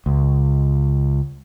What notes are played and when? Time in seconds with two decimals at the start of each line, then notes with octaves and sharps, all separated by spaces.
0.06 C#2